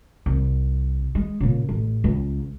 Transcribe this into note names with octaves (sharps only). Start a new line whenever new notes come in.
C2
G#3
A#2 C#3
A1
C#2